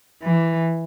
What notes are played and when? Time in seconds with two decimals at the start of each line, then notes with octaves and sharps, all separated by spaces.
0.22 E3